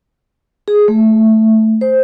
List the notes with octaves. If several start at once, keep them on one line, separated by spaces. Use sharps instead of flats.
G#4
A3
C5